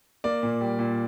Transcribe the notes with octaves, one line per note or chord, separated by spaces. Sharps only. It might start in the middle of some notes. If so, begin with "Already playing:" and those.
A#3 D5
A#2
G3
A#2